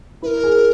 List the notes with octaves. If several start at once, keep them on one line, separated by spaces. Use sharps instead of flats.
E4 A#4 B4
G#4